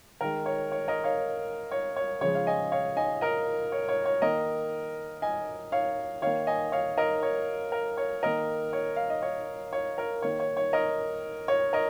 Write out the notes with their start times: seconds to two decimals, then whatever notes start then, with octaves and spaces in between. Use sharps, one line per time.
0.21 D#3 G#3 A#4
0.46 C#5
0.72 C#5
0.88 A#4 D#5
1.04 C#5 F5
1.72 C#5
1.96 C#5
2.21 C#3 F3 G#3 C#5
2.35 F5
2.47 D#5 G#5
2.72 C#5 F5
2.97 D#5 G#5
3.21 A#4 D#5
3.72 C#5
3.89 C#5
4.05 C#5
4.22 D#3 A#3 A#4 D#5
5.22 D#5 G#5
5.72 C#5 F5
6.22 D#3 A#3 C#5 F5
6.47 D#5 G#5
6.72 C#5 F5
6.98 A#4 D#5
7.23 C#5
7.72 A#4
7.97 C#5
8.23 D#3 A#3 A#4 D#5
8.73 C#5
8.96 F5
9.10 D#5
9.22 C#5
9.73 C#5
9.98 A#4
10.22 D#3 A#3 C#5
10.40 C#5
10.57 C#5
10.73 A#4 D#5
11.48 C#5
11.73 A#4 D#5